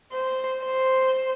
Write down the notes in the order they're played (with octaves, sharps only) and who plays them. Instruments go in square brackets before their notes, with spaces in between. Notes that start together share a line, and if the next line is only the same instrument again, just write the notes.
[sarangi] C5
C5